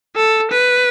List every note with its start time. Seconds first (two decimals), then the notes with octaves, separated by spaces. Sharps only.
0.16 A4
0.51 B4